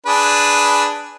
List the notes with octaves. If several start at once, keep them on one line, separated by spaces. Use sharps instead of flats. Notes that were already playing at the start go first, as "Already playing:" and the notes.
D4 G#4 B4